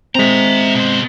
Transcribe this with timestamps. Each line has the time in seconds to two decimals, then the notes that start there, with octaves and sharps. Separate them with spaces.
0.15 G#3 C4 E5 A#5
0.75 B2 C5